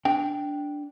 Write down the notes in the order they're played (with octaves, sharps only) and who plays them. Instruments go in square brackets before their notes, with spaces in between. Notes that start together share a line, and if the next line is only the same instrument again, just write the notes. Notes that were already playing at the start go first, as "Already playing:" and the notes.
[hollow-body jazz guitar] D4 G5